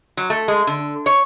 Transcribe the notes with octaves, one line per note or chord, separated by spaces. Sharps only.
F#3
A3
G#3
D3
C#5